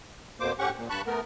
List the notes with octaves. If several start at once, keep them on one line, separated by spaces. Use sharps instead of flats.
F2 B2 A#3 C5 D6
A2 C#4 G4 F#5 C#6
A#2
G2 A5 B5 C#6 F#6
A3 B3 A#4